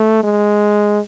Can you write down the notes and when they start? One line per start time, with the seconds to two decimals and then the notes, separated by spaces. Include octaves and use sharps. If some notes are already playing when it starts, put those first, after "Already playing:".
Already playing: A3
0.24 G#3